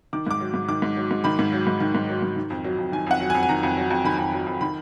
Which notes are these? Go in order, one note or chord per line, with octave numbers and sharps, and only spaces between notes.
D#3 D6
G#2 D6
F#3
G#2
D#3 D6
G#2
F#3
G#2
D#3 B5
G#2
F#3
G#2
D#3
G#2
F#3
G#2
D#3
F2
F#3
F2
D#3 G#5
F2 F#5
F#3
G#5
F2
G#5
D#3 A#5
F2
F#3
F2
D#3 B5
F2
F#3
F2
D#3 B5